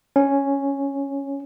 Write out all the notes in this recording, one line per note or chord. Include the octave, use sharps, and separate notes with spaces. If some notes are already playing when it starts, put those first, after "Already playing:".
C#4